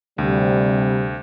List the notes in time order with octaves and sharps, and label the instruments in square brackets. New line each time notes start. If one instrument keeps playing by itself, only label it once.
[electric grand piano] D2 [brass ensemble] C3 G3